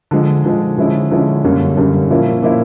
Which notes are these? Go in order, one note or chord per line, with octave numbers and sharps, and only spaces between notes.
D3 F3 G#3
D3 F3 G#3
D3 F3 G#3 C#4 E4
D3 F3 G#3 C#4 E4
F#2 D3 G3 A#3 C#4
F#2 D3 G3 A#3 C#4
A#2 F3 A#3 C#4 E4
A#2 F3 A#3 C#4 E4